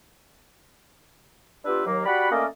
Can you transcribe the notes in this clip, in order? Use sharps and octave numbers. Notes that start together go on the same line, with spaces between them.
B3 D4 F4 G4 B4 E5
D#2 F#3 A#3
F#4 G4 D5 F#5 B5
A3 A#3 C#4 A#4 D5 D#5